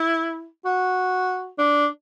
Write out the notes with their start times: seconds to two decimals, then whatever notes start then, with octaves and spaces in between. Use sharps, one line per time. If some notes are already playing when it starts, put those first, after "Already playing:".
Already playing: E4
0.65 F#4
1.58 D4